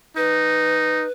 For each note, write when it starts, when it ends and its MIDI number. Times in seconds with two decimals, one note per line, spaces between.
0.17 1.05 63
0.17 1.12 71